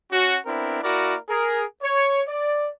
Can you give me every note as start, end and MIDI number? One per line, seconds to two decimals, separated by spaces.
0.12 0.38 61
0.12 0.38 66
0.47 0.82 59
0.47 0.82 60
0.47 0.82 62
0.47 0.82 64
0.47 0.82 70
0.83 1.16 58
0.83 1.16 64
0.83 1.16 66
0.83 1.16 70
0.83 1.16 74
1.29 1.63 68
1.29 1.63 70
1.82 2.21 73
2.28 2.69 74